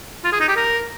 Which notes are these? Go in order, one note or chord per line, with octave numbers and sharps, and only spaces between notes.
F4
G#4
D#4
G4
A#4